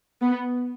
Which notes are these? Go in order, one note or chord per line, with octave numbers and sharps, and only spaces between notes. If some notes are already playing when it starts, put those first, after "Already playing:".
B3